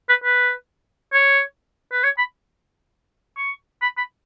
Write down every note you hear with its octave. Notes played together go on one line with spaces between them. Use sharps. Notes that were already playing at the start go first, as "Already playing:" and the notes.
B4
B4
C#5
B4
C#5
B5
C#6
B5
B5